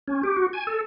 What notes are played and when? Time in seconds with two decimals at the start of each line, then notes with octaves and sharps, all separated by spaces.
0.08 C#4
0.23 G4
0.37 F#4
0.53 G#5
0.67 A4